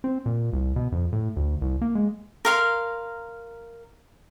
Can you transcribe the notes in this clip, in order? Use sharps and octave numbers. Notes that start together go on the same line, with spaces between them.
C4
A#2
C2
B2
F2
A2
D2
C2
A#3
G#3
A#4 F5 C6